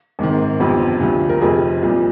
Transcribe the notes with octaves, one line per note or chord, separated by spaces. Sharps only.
G#1 G#2 D#3
G1 F2 C3 F3
D2 C3 F3
A#4
F1 F2 C3 F3 G#4
C2 A#2 F3